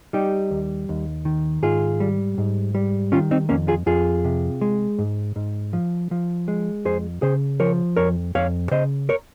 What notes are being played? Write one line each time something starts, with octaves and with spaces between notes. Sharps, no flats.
G3 D#4 G4
D#2
D#2
D#3
G#2 F4 G#4
G3
G#2
G3
D#3 C#4 F4
C4 D#4
F2 A#3 C#4
F4 G#4
F2 F4 G#4
C3
G#3
G#2
G#2
F3
F3
G#3
F2 G#4 C5
C#3 G#4 C5
F3 A#4 C#5
F2 A#4 C#5
F2 C#5 F5
C#3 C5 D#5
A#4 C#5